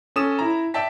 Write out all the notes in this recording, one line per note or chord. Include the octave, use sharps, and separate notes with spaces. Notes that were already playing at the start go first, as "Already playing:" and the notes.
C#4 A4 D#6 E7
E4 A#5
D5 E5 G5 A5 B6